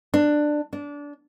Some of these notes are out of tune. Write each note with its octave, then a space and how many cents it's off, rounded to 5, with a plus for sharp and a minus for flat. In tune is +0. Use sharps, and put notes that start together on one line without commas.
D4 +15
D4 -20